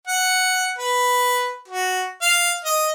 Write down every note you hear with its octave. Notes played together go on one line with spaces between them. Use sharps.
F#5
B4
F#4
F5
D#5